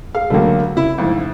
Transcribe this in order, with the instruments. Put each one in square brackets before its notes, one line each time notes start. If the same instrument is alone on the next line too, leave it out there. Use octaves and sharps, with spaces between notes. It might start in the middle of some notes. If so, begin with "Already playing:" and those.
[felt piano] G#4 [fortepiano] F5
[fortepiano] C#2 A3 [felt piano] D3 F#3 A#3
[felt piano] C#3 [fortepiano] E4
[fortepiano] F2 G#2 E3